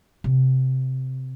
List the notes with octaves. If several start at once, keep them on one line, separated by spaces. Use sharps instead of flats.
C3